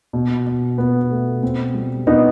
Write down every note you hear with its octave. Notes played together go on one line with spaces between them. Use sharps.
B2
B2
B2 B3
A3
B2 C4
G3
B2 B3 D#4